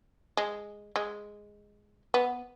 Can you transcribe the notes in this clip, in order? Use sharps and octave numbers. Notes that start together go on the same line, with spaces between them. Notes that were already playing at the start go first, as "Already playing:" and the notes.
G#3
G#3
B3